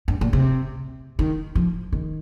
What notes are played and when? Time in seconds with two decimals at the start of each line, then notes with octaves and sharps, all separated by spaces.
0.08 G2
0.21 A#2
0.33 C3
1.19 D#3
1.55 F3
1.93 D#3